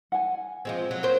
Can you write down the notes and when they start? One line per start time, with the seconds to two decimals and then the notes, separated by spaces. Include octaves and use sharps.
0.12 F#5 G#5
0.65 F3 G#3 C4
0.91 F#3
1.03 F#3 A#4 C5